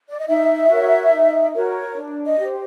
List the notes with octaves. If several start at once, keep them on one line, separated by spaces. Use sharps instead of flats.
D5
D#5
D#4 E5
F#4 A#4 C#5
D#4
F#4 A#4 C#5
D4
D#5
G4 C5